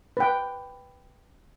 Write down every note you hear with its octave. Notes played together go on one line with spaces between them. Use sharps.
B4 G5